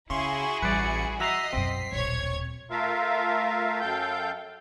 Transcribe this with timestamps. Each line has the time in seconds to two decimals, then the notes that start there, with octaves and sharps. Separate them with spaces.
0.10 C#3 C#4 E4 F#4 G#4 C6 C#6
0.62 A1 G3 B4 D5 C#7
1.20 F#4 D#5 E5 A#5 B6 C7
1.53 B1 F#2 C4
1.92 D#1 B1 C#5 G#6
2.71 A3 F4 A#4 E5 F5
3.81 F#2 A4 F5 G5 G6